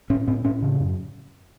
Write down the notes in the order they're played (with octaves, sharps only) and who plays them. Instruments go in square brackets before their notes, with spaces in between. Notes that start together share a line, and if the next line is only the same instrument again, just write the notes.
[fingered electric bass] A2 C#4
A2 C4
A2 C#4
C#3
F#2